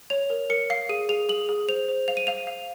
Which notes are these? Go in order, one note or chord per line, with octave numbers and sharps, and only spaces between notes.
C#5 F7
A#4
A#4 C#7
F5 C7
G#4 D#7
G#4 F7
G#4 F#7
G#4
C5 F7
C5
F5 F7
D#7
F5 F7
F5